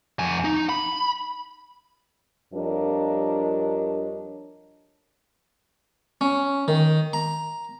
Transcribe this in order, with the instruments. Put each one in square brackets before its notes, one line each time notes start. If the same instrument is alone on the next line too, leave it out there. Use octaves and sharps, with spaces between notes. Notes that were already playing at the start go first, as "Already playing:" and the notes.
[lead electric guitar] F2 G#5
D#4
B5
[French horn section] F2 G3 D4 A#4 C#5 D#5
[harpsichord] C#4
D#3
A#5